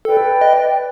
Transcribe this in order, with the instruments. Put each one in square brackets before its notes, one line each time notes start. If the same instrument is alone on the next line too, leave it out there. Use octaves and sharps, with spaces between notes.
[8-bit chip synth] A4 [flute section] B4 D5 G5
[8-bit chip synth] D#5